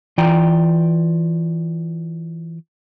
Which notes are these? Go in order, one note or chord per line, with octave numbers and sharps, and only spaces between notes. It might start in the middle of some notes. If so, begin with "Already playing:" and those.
E3 F4 D5 G5 A#5